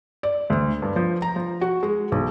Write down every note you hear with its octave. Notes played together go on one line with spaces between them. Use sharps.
D5
D2
G2
F3
A#5
F3
F#4
G#3
B1